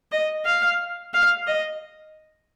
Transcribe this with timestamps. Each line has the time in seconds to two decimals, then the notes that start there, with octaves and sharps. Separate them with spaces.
0.12 D#5
0.45 F5
1.14 F5
1.47 D#5